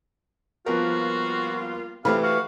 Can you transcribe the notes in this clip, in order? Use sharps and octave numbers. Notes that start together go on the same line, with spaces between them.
F3 G3 A#3 B3 F4 F#4 A#4
C3 E3 A3 G4 F5 B5
F#4 F5